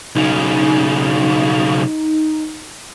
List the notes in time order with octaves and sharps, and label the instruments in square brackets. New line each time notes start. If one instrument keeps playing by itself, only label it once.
[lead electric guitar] B1 C#3 [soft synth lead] D#4